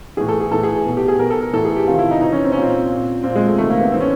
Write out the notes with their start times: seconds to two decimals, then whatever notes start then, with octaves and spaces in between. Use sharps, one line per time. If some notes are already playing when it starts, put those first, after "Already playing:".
0.17 A2 E3 G#4
0.28 A4
0.40 G#4
0.51 A2 E3 A4
0.63 G#4
0.86 B2
0.97 G4
1.08 G#4
1.19 B2 A#4
1.30 A4
1.42 A#4
1.53 A2 E3 A4
1.65 G#4
1.76 G4
1.88 C3 D#3 F4
1.99 E4
2.11 D#4
2.21 C3 E3 D#4
2.32 C#4
2.44 C4
2.52 C#4
2.56 A#2
2.62 C4
2.89 A#2
3.23 A#2 C4
3.35 G#3
3.47 A3
3.58 C3 D#3 A3
3.70 A#3
3.81 B3
3.92 A2 E3 C4
4.00 C#4